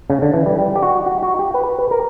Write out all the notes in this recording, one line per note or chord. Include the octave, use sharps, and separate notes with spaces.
C#3
D3
E3
G3
G3
G4
F#4
F#4
F#4
G4
B4
B4
A#4